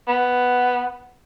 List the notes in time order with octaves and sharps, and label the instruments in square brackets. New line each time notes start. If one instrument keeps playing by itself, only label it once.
[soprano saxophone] B3